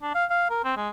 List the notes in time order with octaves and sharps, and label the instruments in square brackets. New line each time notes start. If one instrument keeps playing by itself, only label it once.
[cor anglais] D4
F5
F5
A#4
C4
G#3